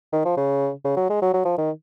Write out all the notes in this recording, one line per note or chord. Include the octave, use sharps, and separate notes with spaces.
D#3
F3
C#3
C#3
F#3
G#3
F#3
F#3
F3
D#3